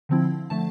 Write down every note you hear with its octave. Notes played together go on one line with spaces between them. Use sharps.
D3 F3 C4 E4
D3 F3 A3 A5